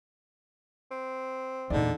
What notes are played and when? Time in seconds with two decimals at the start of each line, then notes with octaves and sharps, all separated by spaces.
0.91 C4
1.70 E2 A#2 D3 D#4 D5